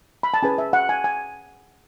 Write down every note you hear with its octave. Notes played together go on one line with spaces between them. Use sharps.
B5
A5
C#4 G#4 B4 G#5
E5
F#5
G#5
G#5